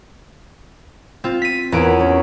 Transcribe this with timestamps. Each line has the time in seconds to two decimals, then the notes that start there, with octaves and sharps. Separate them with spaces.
1.24 C4 F4
1.42 B6 D#7
1.72 E2 A#4 C#5 F#5 D7
1.99 C#4 C#5